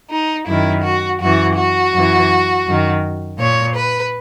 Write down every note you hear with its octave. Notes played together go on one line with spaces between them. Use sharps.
D#4
F#2 D#3 E4
F#4
F#2 E3 F#4
F#4
F#2 E3
F#2 D#3
A#2 C#5
B4